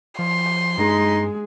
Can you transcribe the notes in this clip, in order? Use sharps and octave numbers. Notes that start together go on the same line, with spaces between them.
F3 C6
G2 G#3 D#4 G#4